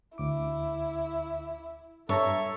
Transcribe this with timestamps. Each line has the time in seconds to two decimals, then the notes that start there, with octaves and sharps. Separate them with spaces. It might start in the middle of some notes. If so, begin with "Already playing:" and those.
0.18 D2 E4 D6
2.09 G2 A4 C#5 E5 A5 A#5